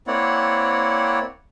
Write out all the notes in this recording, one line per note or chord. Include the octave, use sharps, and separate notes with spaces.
A#3 C4 E4 C#5 D5 F#5